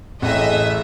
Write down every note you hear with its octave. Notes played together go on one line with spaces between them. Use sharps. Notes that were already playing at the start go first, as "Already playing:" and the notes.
A1 A3 G#4 D#5 E5